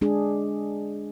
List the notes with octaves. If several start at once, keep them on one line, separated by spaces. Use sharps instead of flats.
G#3 D4 G#4